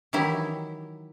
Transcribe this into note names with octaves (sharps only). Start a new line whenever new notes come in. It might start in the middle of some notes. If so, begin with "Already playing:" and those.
D#3 E3 F#3 E4 G4